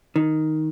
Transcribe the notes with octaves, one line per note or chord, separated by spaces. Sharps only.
D#3